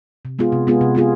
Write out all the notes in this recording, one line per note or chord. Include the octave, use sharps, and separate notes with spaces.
C3
G#3 B3 F4 G#4
C3
G#3 B3 F4 G#4
C3
G#3 B3 F4 G#4